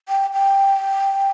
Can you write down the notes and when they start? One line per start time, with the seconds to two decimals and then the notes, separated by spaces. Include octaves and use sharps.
0.09 G5
0.34 G5